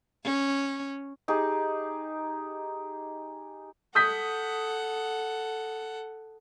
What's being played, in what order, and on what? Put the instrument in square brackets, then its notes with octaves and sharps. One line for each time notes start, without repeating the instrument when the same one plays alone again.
[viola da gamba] C#4
[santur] D#4 G4 G#4
[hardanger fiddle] A4 F#5 [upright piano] D#6 G6 B6